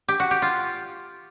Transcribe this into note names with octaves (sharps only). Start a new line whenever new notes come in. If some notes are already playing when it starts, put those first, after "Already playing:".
G4
F#4
G4
F4